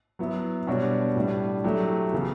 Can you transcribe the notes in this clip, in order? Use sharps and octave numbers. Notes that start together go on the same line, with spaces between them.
F#3 B3 E4
B2 G3 D4 F#4 C#5
A2 G3 D4
F#3 A3 E4 G4
C#3 E3 B3